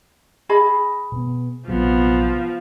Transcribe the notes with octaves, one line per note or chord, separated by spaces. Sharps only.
G#4 D#5 B5
B2 B3
A#1 C3 F3 F#3 B3